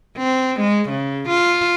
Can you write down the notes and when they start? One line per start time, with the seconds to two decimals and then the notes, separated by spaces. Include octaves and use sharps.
0.18 C4
0.60 G#3
0.90 C#3
1.29 F4